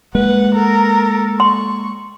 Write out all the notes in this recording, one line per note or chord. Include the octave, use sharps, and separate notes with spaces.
G#3 A#3 B4 F#5
A4 A#4
C6 C#6